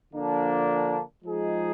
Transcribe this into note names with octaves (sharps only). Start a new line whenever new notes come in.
D3 F3 A#3 D4
F3 G#3 D#4 G#4